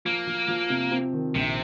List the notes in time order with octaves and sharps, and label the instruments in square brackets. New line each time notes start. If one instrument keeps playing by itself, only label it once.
[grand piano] F3 [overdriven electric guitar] A#3
[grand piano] F3
F3
C3
C4
D#3
[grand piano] A#1 [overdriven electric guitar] C3